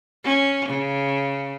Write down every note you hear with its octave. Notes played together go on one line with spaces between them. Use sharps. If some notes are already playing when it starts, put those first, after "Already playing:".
C#4
C#3